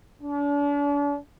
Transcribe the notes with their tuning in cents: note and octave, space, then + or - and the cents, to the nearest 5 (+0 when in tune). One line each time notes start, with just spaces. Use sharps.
D4 -40